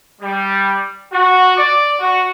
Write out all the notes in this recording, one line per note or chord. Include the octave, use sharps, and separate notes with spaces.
G3
F#4
D5
F#4